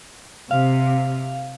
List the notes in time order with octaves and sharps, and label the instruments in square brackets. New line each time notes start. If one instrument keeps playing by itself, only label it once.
[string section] C3 [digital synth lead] F5